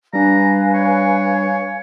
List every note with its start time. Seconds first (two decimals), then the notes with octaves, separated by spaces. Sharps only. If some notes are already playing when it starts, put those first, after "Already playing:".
0.13 G3 D4 B4 F5 G#5 A#5
0.74 C#5